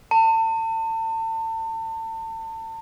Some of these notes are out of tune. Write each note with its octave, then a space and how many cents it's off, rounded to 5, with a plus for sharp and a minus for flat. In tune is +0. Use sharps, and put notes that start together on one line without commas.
A5 +35